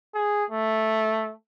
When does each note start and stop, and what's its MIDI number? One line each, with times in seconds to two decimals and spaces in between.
0.14 0.44 68
0.50 1.34 57